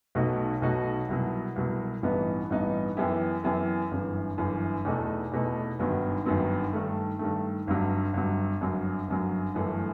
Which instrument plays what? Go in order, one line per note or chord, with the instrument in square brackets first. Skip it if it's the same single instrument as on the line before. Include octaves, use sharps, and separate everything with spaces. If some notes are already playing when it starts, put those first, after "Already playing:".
[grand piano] B1 B2 A3 D#4 F#4
B1 B2 A3 D#4 F#4
C2 B2 F#3
C2 B2 F#3
A1 G2 E3 B3 D#4
A1 G2 E3 B3 D#4
F#2 E3 B3 E4 G4
F#2 E3 B3 E4 G4
G1 F#2 E3
G1 F#2 E3
E2 B2 A3 D#4
E2 B2 A3 D#4
G1 F#2 D#3 F#3 B3
G1 F#2 D#3 F#3 B3
G2 D#3 A3
G2 D#3 A3
G1 G2 F#3
G1 G2 F#3
G1 F#2 F#3
G1 F#2 F#3
G1 F#2 E3 A3